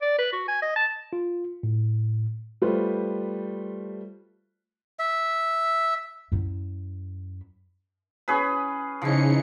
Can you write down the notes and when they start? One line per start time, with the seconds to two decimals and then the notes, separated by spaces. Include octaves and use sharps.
0.02 D5
0.18 B4
0.33 F#4
0.48 G#5
0.62 D#5
0.76 A5
1.13 F4
1.63 A2
2.62 G3 A3 F4 B4 C5
4.99 E5
6.32 F#2 E4
8.28 C#4 G#4 B4
9.02 C#3 E3 F3 D#4 C#7